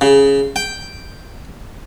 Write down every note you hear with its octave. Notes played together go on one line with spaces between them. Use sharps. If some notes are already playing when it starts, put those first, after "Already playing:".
C#3
G5